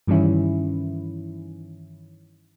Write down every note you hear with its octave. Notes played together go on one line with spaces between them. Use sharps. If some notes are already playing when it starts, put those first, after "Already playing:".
G2 D#3 E3 G3 C#4 E4